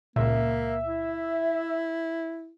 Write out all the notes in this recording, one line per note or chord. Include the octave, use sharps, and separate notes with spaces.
C#2 A#2 A#3 E5
E4